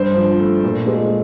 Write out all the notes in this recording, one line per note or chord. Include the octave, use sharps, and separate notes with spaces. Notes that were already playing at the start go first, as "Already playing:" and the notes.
Already playing: G2 C5
F3
A3
A#2
G#3